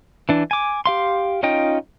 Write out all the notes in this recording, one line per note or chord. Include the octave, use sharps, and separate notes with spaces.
E3 D4
G#5 D6
G4 F5 C6
C#4 D#4 F4 D#5 G5